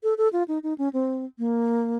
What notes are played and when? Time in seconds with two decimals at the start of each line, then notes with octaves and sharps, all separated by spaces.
0.03 A4
0.18 A4
0.33 F4
0.48 D#4
0.63 D#4
0.78 C#4
0.93 C4
1.38 A#3